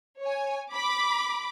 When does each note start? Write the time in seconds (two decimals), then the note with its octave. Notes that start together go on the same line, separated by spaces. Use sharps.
0.22 C#5 G#5
0.73 B5 D6